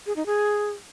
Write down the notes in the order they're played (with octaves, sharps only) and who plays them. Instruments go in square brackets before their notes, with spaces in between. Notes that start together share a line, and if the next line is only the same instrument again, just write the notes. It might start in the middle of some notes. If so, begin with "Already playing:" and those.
[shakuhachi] G#4
D#4
G#4